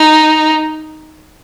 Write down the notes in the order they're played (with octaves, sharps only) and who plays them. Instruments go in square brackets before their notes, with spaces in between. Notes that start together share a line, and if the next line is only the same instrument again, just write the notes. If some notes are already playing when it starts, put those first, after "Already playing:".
Already playing: [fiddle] D#4